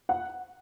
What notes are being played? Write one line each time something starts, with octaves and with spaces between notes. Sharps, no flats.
F#5